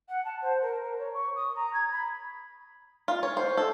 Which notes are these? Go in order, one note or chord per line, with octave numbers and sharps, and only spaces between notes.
F#5
A5
C5
A#4
A#4
C#5
C#6
D#6
A#5
G#6
B5
F4
C#5
C5
A4